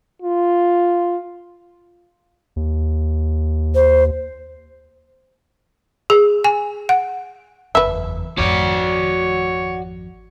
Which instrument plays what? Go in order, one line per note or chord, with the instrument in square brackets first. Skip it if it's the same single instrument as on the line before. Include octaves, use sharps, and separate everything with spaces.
[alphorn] F4
[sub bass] D#2
[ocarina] C5
[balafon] G#4
G#5
F#5
[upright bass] F#1 E2 [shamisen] B4 E5
[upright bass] G#1 F2 [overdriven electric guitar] F#4 D5 [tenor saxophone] C#5